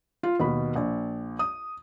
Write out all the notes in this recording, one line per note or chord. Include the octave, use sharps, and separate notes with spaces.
F4
D#2 B2 B5
A#1
D#6